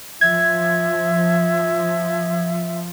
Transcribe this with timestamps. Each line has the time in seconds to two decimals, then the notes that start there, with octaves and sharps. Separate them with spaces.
0.21 F3 E5 G#6